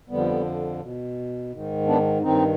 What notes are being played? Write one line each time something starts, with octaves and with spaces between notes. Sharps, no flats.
F2 D3 F3 G3 B3
B2
G#2 D#3
B3 D4
G2 D#3 C4 D#4